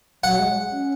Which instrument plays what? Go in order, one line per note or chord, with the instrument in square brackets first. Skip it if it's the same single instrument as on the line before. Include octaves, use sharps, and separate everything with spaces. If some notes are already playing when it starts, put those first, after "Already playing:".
[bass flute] F#3 [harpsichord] F#5
[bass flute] G#3
C#4